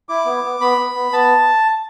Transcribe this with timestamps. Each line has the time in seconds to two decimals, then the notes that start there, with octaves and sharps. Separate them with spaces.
0.09 E4 D6
0.26 B3
0.44 B3
0.60 B3 B5
0.78 B3
0.95 B3
1.12 B3 A5